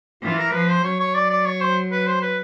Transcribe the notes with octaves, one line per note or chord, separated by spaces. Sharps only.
E3 F4
A#4
F3 B4
C5
F#3 C#5
C#5
D5
D5
C#5
C5
B4
C5
B4